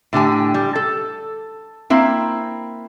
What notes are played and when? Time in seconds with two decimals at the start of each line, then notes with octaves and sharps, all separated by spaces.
0.13 A2 D3 G4 G#5
0.54 G3
0.76 A4
1.90 A#3 C4 E4